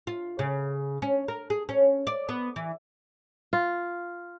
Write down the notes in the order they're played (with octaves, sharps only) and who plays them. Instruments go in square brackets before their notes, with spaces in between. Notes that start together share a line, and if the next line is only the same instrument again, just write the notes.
[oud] F4
C#3
C#4
A#4
G#4
C#4
D5
B3
E3
[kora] F4